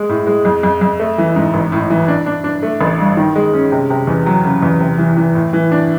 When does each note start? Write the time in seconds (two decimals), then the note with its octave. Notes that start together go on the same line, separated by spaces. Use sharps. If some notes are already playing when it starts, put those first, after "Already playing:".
Already playing: G#3
0.09 A2
0.27 G#3
0.45 F2
0.63 F2
0.81 F2
0.99 A3
1.18 E3
1.36 G#2
1.54 A1
1.72 A2
1.90 E3
2.08 D4
2.26 D4
2.44 D4
2.62 A3
2.81 A1
3.00 G2
3.17 D#3
3.35 G#3
3.53 C#4
3.72 C3
3.90 C3
4.07 E2
4.26 F#3
4.44 C#3
4.62 E2
4.81 C3
4.98 E3
5.17 E3
5.35 A2
5.53 E3
5.71 D4